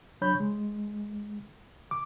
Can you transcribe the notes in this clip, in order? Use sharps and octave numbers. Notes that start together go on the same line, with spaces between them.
F#3 D4 C#5 B5 G6
G#3
D6